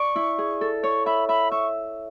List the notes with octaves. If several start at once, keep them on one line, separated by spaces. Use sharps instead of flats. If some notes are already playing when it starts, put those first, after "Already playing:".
Already playing: D5 C#6
E4
G#4
A4
C#5 C#6
E5 B5
E5 B5
E5 C#6